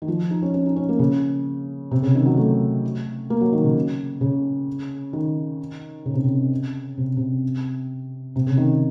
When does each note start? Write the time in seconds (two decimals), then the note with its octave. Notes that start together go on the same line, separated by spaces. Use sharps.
0.02 D#3
0.08 F3
0.31 D#4
0.42 C#4
0.54 C#4
0.66 D#4
0.76 C#4
0.89 A#3
0.99 C#3
1.91 C3
2.03 C#3
2.15 D#3
2.26 F#3
2.37 A3
3.30 A#3
3.41 F#3
3.53 D#3
3.64 C#3
4.21 C#3
5.13 D#3
6.05 C#3
6.14 C3
6.24 C#3
6.97 C3
7.17 C3
8.36 C3
8.47 C#3
8.58 D#3